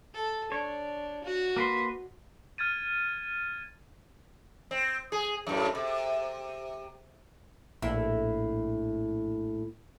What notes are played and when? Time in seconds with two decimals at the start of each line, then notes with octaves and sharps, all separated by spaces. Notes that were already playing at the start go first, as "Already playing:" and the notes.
0.14 A4
0.52 D4 C#5
1.24 F#4
1.56 A#3 B4 C6
2.58 F6 G#6 A6 D#7
4.71 C4
5.12 G#4
5.47 F#2 A2
5.75 C3
7.82 A#1 A2 E4